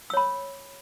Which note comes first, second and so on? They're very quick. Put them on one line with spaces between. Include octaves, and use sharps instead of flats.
E6 C#5 B5